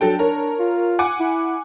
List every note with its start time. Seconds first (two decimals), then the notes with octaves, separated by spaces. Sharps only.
0.01 F#3 D4 A4 G5
0.19 A#4 C#5
0.59 F4
0.99 F#5 G#5 D6
1.20 E4